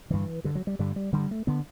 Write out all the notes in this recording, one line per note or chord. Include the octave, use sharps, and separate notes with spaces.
G2 D3 E3
G2 D3
F#3
G3
G2 D3 G3
G3
G2 D3 G3
A3
D3 B3